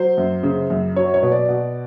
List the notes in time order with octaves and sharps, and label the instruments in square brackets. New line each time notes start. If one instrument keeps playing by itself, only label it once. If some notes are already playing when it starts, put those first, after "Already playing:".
Already playing: [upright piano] F#3 C5
F#2
C#3
F#2
F#3 C#5
C#5
B2
D5
B2